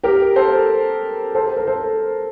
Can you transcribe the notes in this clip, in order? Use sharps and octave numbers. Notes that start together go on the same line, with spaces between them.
G4 A#4
A4 C5
A4 C5
A4
A#4
A4 C5